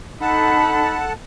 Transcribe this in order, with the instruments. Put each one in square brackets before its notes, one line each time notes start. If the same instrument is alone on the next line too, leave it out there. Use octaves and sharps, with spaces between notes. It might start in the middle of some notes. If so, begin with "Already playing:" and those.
[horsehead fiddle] D#4 B5 [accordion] A4 F#5 A5